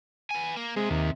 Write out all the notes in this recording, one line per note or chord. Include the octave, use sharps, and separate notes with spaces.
B3 G#5
A#3
C3 G#3
D#2